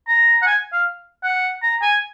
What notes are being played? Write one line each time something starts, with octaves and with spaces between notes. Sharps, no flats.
A#5
F#5
G#5
F5
F#5
A#5
G#5